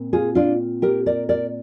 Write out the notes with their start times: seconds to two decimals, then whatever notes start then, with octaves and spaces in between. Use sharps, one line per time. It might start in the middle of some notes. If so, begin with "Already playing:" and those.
Already playing: A#2 C4
0.13 F4 G#4
0.35 D4 F4
0.82 G4 A#4
1.06 A#4 D5
1.29 A#4 D5